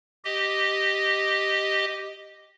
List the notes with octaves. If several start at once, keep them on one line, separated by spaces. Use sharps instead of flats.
G4 D#5